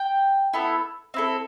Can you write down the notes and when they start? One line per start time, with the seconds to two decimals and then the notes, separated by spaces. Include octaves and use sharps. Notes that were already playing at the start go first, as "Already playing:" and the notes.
Already playing: G5
0.53 B3 E4 A4
1.14 C4 E4 A4